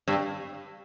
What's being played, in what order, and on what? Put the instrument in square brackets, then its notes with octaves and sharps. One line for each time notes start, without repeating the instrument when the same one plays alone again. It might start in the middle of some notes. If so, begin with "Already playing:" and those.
[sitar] G2